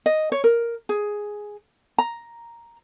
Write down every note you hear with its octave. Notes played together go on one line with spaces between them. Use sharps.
D#5
C#5
A#4
G#4
A#5